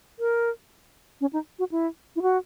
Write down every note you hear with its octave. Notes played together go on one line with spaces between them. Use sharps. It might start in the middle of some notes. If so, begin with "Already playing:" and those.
A#4
C#4
D#4
F#4
E4
E4
F#4